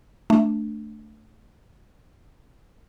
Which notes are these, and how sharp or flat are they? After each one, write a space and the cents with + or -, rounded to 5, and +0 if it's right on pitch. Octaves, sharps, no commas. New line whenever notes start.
A3 +0 D4 +0